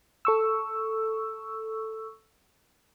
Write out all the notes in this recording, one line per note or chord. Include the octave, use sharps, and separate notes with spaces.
A4 C#6 E6